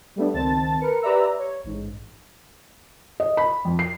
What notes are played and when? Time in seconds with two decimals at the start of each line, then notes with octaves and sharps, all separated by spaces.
0.16 G3 A3 B3 D4
0.33 C#2 D#3 C4 A5 A6
0.81 A#4 B4 C#7
1.02 G4 B4 D5 E5 A#5 E6
1.39 C#5
1.64 A1 G#2
3.20 D#5
3.37 B5
3.65 F2
3.79 C7